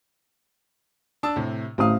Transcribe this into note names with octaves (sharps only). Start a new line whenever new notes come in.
D4 A5 E6
A2 C3
A1 C4 F5 D#6